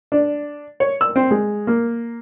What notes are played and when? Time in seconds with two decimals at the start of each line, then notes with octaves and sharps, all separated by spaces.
0.12 D4
0.80 C#5
1.01 E6
1.16 C4
1.31 G#3
1.67 A#3